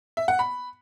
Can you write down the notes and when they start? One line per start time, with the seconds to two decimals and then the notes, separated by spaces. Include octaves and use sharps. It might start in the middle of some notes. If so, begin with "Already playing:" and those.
0.17 E5
0.28 F#5
0.39 B5